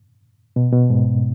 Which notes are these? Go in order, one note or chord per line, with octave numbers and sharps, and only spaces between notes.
B2
B2
G#2